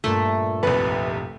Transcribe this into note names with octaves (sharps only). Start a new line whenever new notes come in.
G2 A#2 A3 E5
F1 C2 B4